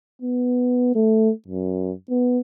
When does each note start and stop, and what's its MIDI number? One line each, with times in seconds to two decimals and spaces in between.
0.22 0.94 59
0.95 1.31 57
1.48 1.92 42
2.10 2.40 59